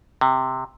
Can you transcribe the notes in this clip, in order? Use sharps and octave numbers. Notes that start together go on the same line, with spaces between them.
C3